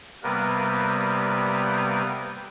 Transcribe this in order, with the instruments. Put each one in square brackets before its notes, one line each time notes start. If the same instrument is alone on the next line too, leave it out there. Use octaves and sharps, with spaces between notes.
[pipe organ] C3 G3 A#3 B3 A#4 B4